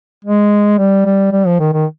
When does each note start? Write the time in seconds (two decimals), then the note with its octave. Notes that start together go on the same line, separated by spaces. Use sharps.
0.25 G#3
0.78 G3
1.05 G3
1.32 G3
1.47 F3
1.60 D#3
1.73 D#3